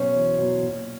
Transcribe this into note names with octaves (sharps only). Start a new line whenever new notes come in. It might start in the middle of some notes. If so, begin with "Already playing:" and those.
Already playing: B2 F#3 C#4 C5 C#5
E2
B2 F#3
A#2